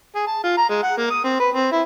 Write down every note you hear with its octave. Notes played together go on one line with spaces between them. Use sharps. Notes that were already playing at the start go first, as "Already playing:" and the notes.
G#4
A5
F4
A#5
G#3
F#5
A#3
D#6
C4
B4
C4
E4